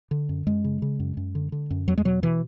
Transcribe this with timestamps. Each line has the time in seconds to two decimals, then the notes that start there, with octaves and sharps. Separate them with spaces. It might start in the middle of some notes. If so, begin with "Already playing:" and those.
0.11 D3
0.29 F#2
0.47 F#2 G#3
0.64 C#3
0.82 C#3
1.00 F#2
1.17 F#2
1.35 D3
1.52 D3
1.70 F#2
1.87 E2 F#3
1.98 G#3
2.05 B2 F#3
2.23 B2 E3